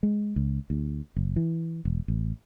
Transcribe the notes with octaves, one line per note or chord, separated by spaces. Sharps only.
G#3
C#2
D2
F#1
E3
E1
A1